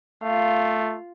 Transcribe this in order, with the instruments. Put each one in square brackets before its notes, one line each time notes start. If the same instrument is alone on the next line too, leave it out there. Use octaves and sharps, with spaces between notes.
[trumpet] A3 [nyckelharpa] F4 F5